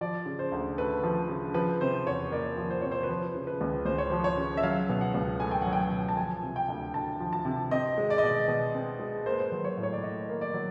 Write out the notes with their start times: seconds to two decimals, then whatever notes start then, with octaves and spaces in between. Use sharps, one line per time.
0.01 F3 D5
0.26 C#3
0.39 C5
0.52 D2
0.78 A3 B4
1.03 F3
1.29 C#3
1.54 F3 B4
1.81 C3 C5
2.06 E2 C#5
2.31 A#3 D5
2.58 F3
2.70 C5
2.81 C3 C#5
2.91 C5
3.03 B4
3.09 F3 C5
3.35 C#3
3.47 B4
3.61 C#2
3.86 C#2 C5
3.98 C#5
4.10 F3 C5
4.24 C#5
4.38 C#3
4.57 E5
4.63 F#3 F5
4.89 B2
5.01 F#5
5.14 C#2
5.40 A3 G#5
5.51 G5
5.62 F#3 F#5
5.73 G5
5.92 B2
6.09 A5
6.17 F3 G#5
6.43 C3
6.56 G5
6.68 D2
6.94 D2 A5
7.20 F3
7.33 A5
7.45 C3
7.71 C4 D#5
7.98 G#3
8.10 D5
8.18 D#5
8.23 B2 D5
8.48 B2
8.75 C4
8.99 G#3
9.25 A#3 C5
9.33 B4
9.40 C5
9.52 F#3
9.65 C#5
9.78 A2
9.83 C#5
9.93 D5
10.03 A2 D#5
10.29 A#3
10.41 D5
10.54 F#3